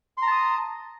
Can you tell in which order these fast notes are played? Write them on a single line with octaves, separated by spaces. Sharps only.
C6 A#5 A5 D#6